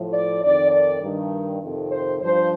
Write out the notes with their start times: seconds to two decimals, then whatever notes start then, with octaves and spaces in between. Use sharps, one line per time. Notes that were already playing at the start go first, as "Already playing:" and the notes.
Already playing: A2 F3
0.12 D5
0.41 F2 D#3 D5
0.71 D5
1.00 G2 D#3
1.60 F2 C3 D#3
1.89 C5
2.19 G2 F3 C5